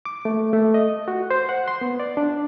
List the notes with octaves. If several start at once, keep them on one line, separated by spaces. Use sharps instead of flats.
D6
A3
A3
D#5
F#4
C5
F#5
C6
B3
D5
D4